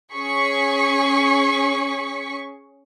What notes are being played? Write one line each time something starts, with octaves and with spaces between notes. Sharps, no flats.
C#4 G#4 C#6 B6 C#7